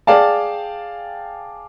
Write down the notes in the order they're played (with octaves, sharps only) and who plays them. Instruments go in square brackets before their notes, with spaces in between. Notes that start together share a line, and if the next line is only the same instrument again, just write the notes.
[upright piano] G#4 D5 F5 G5 A5